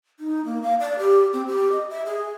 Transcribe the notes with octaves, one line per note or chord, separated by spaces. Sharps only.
D#4
A#3
F5
D5
G4
C4
G4
D#5
E5
G#4